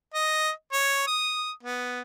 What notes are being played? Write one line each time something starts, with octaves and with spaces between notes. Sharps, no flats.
D#5
C#5
D#6
B3